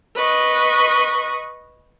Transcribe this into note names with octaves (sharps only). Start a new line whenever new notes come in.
B4 D#5 C#6